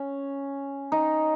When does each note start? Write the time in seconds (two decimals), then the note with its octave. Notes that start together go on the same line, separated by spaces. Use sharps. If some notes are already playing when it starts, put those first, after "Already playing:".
Already playing: C#4
0.92 D#4